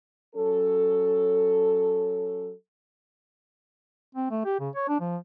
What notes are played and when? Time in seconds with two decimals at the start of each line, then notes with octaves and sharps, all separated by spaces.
0.36 F#3 C#4 A4
4.15 C4
4.30 A3
4.45 G4
4.60 C#3
4.75 C#5
4.88 D4
5.00 F3